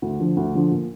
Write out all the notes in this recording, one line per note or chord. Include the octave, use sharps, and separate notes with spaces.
D2
D3 F3
D2
D3 F3
A#2